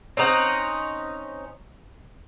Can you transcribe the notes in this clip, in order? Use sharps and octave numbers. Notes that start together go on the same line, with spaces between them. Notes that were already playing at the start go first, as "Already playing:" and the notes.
C4 C#4 D#4 F#5